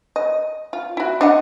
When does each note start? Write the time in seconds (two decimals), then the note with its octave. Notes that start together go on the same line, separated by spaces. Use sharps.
0.16 D#5
0.73 F4
0.97 E4 F#4
1.21 D4 D#5 F#5